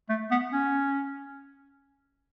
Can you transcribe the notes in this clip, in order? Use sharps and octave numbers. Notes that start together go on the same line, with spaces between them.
A3
B3
C#4